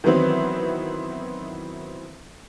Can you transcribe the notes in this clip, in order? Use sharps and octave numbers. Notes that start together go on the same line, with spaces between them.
D#3 E3 F#3 B3 C4 E4